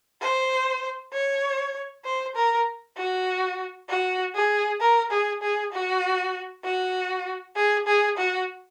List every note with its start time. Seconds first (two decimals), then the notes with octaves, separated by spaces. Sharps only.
0.21 C5
1.13 C#5
2.05 C5
2.35 A#4
2.97 F#4
3.88 F#4
4.35 G#4
4.80 A#4
5.11 G#4
5.42 G#4
5.72 F#4
6.64 F#4
7.56 G#4
7.87 G#4
8.17 F#4